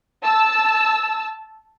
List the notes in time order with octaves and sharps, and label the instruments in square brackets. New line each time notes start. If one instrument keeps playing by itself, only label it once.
[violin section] A5 E6